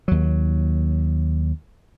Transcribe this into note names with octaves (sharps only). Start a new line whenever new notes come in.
D#2 F#3